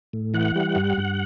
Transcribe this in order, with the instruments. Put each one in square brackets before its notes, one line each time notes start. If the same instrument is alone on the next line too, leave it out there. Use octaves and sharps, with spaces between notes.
[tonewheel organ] A2
E3 F#5
G3
G2
G2